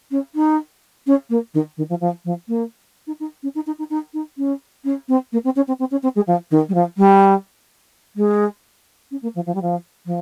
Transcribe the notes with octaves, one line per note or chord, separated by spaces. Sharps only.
C#4
D#4
C#4
A#3
D#3
D#3
F3
F3
F3
A#3
D#4
D#4
C#4
D#4
D#4
D#4
D#4
D#4
C#4
C#4
C4
A#3
C4
C#4
C4
C4
C#4
C4
G#3
F3
D#3
G3
F3
G3
G#3
C#4
A#3
F3
F3
G3
F3
F3